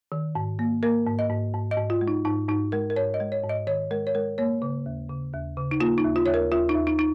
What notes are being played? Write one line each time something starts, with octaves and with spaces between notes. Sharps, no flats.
D#3
G#2
A#3
A#3 A#4
G#2
D#5
G#2
G#2
D#5
G#2
F4
G#3
D#4
G#2 D#4
G#2 D#4
G#3 A#4
A#4
G#2 C#5
D#5
G#3
C#5
G#2
D#5
D#3 C#5
G#3 A#4
C#5
G#3 A#4
A#3 C#5
C#3
D#2
C#3
D#2
C#3
D#4
A#3 F4
D#4
D#2
F4
D#2 C#5
A#4
D#2 F4
D#4
D#2
D#4
D#4